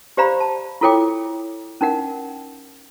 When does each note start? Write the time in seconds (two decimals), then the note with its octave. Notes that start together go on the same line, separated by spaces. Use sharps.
0.17 G4 C5 D5 F5 A#5 B5
0.40 A5
0.81 E4 F4 A4 C#5 G5 D6
1.81 C#4 D#4 A#4 F#5